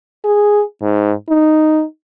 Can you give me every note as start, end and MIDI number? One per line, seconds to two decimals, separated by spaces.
0.25 0.63 68
0.82 1.12 44
1.29 1.84 63